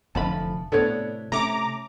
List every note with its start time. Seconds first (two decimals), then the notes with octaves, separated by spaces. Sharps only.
0.15 F1 F2 D3 E3 F3 A5 B5
0.72 A2 C3 B3 D4 A4 C#5
1.32 C3 A3 C#4 A#5 D6